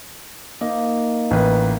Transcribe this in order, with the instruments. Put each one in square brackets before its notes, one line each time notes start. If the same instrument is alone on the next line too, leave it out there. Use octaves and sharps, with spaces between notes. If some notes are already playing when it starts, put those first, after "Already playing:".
[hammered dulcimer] A#3 D#4
[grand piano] A1 B4